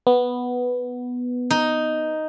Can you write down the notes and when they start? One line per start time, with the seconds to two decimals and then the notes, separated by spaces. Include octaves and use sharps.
0.07 B3
1.51 D#4